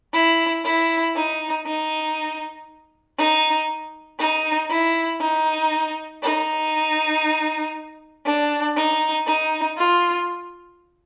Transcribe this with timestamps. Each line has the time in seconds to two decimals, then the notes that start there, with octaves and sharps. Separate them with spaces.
0.13 E4
0.65 E4
1.16 D#4
1.66 D#4
3.18 D#4
4.19 D#4
4.70 E4
5.21 D#4
6.23 D#4
8.26 D4
8.76 D#4
9.27 D#4
9.78 F4